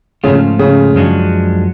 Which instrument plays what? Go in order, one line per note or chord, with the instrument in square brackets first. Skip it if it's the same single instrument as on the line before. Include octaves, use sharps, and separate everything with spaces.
[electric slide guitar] G#2 F3 A3 C#4 F4 [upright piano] C#3
[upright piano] C#3
[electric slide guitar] F#2 F3 G#3 D4 F#4